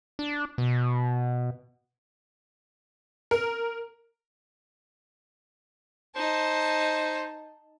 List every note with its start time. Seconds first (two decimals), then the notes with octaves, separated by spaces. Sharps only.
0.19 D4
0.58 B2
3.31 A#4
6.16 D#4 C5 A5